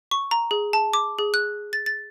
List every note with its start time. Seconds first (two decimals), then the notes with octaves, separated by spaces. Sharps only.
0.11 C#6
0.31 A#5
0.51 G#4
0.73 A5
0.94 D6
1.19 G#4
1.34 F#6
1.73 A6
1.86 A6